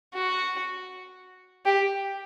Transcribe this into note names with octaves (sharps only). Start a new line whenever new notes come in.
F#4
G4